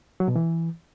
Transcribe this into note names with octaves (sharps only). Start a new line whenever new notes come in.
F#3
B2
E3